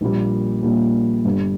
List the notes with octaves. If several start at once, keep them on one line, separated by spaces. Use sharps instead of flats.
A#1 A#2 G3 A#3
A#1 A#2 G3 A#3
G1 G2 G3